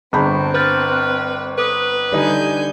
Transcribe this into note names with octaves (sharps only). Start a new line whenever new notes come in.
G1 C4 G#4 A5 B5 G6
B4 F6 G6 A6
F6 F#6
A4 B4 D6 D#6
D3 G3 D#4 G#5 G6